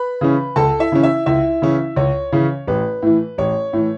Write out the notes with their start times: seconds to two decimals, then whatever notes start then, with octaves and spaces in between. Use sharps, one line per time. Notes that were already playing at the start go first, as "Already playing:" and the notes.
Already playing: B4 B5
0.21 C#3 E3 C#4
0.56 C#2 A4 A5
0.79 E4 E5
0.92 C#3 E3 C#4
1.03 E4 E5
1.26 C#2 E4 E5
1.62 C#3 E3 C#4
1.96 C#2 C#5
2.32 C#3 E3 C#4
2.68 A1 B4
3.02 A2 E3
3.38 A1 C#5
3.73 A2 E3